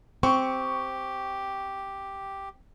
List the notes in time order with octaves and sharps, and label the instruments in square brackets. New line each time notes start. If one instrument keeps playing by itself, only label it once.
[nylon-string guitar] C4 [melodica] G4 [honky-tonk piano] C#6